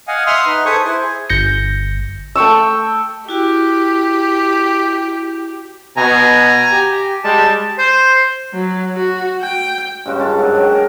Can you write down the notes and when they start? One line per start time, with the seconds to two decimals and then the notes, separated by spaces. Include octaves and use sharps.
0.08 D#5 F5 F#5 G#5
0.27 E5 F#5 C6 D#6 F6
0.46 D#4 B4
0.65 G#4 A4 B4 C5 C#6 D#6
0.84 E4 C5
1.01 G#4
1.30 G1 G6 A#6 C#7
2.35 A3 G5 C#6 E6
3.29 E4 F#4 G4 G5
5.97 B2 G#5 A#5
6.71 G4
7.24 G3 G#3 A5
7.78 C5
8.54 F#3
8.96 F#4
9.42 G5
10.06 G2 C#3 G#3 F#4
10.19 C#4 F4 A#4 A5
10.38 G#2 F#3 D4
10.56 F#4 G5
10.72 G#4 A#4